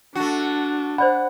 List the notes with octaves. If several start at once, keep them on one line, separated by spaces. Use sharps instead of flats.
A3 D4 F#4
C5 D5 F#5 B5